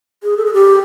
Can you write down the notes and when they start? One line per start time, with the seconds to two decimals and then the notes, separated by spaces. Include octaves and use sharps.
0.23 G#4
0.37 A4
0.46 G#4
0.54 G4